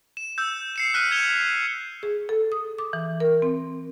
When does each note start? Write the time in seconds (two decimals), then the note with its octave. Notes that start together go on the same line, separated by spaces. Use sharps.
0.17 E7
0.38 E6 G6
0.76 C7 C#7 E7
0.94 F6 F#6 B6 C#7 D#7
1.11 G#6 C#7 E7 F7 G7
2.03 G#4
2.29 A4
2.52 D#6
2.78 D6
2.93 E3
3.20 A#4
3.42 C4